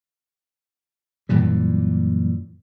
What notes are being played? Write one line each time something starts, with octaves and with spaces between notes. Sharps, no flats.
F#2 A#2 E3 G3